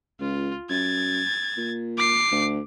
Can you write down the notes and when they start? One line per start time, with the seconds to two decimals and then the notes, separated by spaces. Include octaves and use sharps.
0.20 C#2 F4
0.70 F#2 G#6 A6
1.57 A#2
1.97 D6 C7
2.31 D2